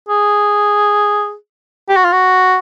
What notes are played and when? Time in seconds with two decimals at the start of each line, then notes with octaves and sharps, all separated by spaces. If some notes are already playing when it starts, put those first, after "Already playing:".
0.08 G#4
1.89 G4
1.96 F#4
2.04 F4
2.12 F#4